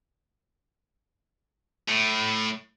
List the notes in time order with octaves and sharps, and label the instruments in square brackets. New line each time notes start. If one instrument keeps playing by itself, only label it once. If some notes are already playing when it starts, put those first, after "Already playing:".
[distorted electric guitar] A2